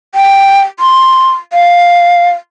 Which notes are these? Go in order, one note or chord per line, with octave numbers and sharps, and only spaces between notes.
G5
C6
F5